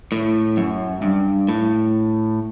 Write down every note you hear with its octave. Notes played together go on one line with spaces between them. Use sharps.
A2
F#2
G2
A2